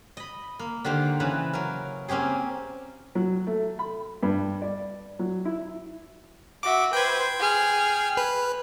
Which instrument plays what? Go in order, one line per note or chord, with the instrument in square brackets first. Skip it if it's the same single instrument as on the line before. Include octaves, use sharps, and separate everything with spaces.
[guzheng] D#5 B5
A#3
D3 D#3 G4 C5 F5
C#3 E3 B4
F#3 A#4
A#3 C4 C#4 G4 G#4
[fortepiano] F#3
A3
B5
G2
D5
F#3
E4
[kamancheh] F#4 E5 [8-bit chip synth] D6
[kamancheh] B4 C5 [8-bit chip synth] G5 G#6
[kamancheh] G#4 F6
[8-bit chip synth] B4